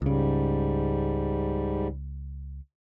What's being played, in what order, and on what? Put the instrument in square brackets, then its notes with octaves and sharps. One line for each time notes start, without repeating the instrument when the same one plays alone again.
[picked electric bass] C#2 C#3 [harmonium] G#2 G3